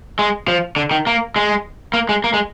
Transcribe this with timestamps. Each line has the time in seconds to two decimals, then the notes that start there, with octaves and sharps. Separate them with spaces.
0.19 G#3
0.48 F3
0.76 D3
0.91 D#3
1.07 A#3
1.36 G#3
1.94 A#3
2.09 G#3
2.24 A#3
2.34 G#3